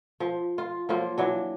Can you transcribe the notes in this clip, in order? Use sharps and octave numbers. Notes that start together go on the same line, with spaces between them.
F3
F4
F3 F#3 A#3 F4
E3 F#3 D4